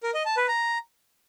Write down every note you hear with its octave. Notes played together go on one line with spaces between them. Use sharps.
A#4
D#5
A5
B4
A#5